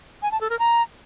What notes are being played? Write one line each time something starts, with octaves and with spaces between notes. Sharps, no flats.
G#5
A5
A4
A#4
A#5